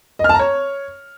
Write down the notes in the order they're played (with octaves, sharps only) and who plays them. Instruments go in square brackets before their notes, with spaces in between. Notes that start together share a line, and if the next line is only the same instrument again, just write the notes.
[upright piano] D#5
F6
A5
A#5
C#5